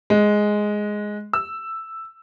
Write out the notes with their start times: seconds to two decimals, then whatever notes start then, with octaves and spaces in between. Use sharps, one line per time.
0.10 G#3
1.33 E6